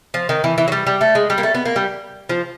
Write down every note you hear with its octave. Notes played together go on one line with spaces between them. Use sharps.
F3
D#3
E3
E3
F#3
G3
G3
A3
G#3
G3
A#3
A3
B3
A#3
G3
F3